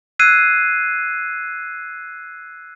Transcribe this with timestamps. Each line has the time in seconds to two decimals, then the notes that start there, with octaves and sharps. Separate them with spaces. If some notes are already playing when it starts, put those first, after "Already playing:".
0.19 E6 F#6 G#6 C7 D#7